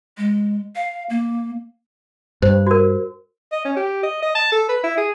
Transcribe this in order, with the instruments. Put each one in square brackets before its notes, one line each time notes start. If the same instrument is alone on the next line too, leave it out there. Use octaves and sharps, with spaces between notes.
[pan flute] G#3
F5
A#3
[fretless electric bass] G2 [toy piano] C5
[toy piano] F#4 A#4
[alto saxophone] D#5
C#4
G4
D#5
D#5
A5
A4
B4
E4
G#4